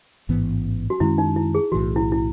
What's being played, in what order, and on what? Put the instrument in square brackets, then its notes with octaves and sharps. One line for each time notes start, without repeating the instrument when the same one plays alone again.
[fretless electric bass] A1 G#2 E3 B3
[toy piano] F#4
[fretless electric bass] F#2 D#3 G#3 C#4 [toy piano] E4
[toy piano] D#4
E4
G#4
[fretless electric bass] E3 [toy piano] F#4
[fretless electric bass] B1 A2
[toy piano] E4
E4